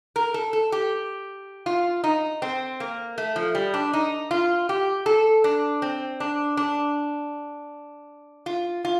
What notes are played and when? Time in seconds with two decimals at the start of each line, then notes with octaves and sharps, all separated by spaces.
0.16 A#4
0.34 A4
0.53 A4
0.72 G4
1.66 F4
2.04 D#4
2.42 C4
2.80 A#3
3.18 A3
3.36 F3
3.55 G3
3.74 D4
3.93 D#4
4.31 F4
4.69 G4
5.06 A4
5.44 D4
5.82 C4
6.20 D4
6.57 D4
8.46 F4
8.85 F4